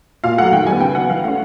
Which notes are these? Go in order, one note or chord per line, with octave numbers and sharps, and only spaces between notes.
A#2 F5
F#3 A3 F#5
D#3 G5
G3 B3 G#5
C#3 G5
F#3 B3 F#5
E3 F5
A3 C#4 F#5